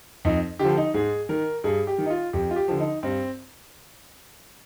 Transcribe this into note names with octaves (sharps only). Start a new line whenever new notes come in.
F2 D#4
D3 F3 G4
D#4
G#2 G#4
D#3 A#4
G2 G#4
G4
D#3
D#4
F4
F2 G4
F4
G4
D3 F3
D#4
G2 C4